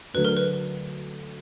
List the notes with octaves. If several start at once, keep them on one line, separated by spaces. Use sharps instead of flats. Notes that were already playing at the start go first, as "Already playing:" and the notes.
D2 D3 F#3 B4
A#4
B4